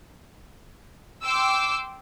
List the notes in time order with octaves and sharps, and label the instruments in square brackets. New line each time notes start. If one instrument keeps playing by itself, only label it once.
[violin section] G5 C6 D6 E6